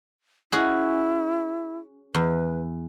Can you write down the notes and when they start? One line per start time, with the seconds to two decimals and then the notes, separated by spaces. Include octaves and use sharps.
0.52 C#4 E4 F#4 G#4
2.14 E2 B4